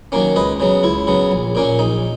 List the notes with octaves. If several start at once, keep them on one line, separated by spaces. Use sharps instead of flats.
D#3 F#3 A#3 C#4
C#2 B4 D#5
C#3 F#3 B3
C#2 E4
C#3 F#3 B3
A#1
A#2 A#3 C#4
A#1 D#4